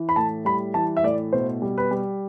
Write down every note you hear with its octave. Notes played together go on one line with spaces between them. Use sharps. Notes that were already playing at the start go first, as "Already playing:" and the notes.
Already playing: E3
B5
A2 A5
G3 B5
E3 A5
E5
A2 D5
B2 C5
G3
B4
G3